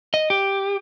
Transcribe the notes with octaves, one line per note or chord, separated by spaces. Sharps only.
D#5
G4